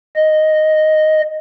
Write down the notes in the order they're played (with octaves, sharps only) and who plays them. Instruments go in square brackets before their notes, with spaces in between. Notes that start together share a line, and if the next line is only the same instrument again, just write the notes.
[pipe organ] D#5